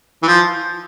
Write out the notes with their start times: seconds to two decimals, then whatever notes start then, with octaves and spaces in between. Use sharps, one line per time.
0.23 E3
0.28 F3